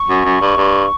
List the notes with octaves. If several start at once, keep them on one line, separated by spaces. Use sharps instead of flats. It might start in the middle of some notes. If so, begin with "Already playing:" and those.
Already playing: C#6
F#2
F#2
G2
G2